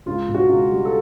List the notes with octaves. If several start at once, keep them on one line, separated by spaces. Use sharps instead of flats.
C#2 F4
B2
F#4
C#2
G3
A4